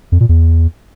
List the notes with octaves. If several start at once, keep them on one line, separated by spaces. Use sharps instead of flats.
F2
A#2
E2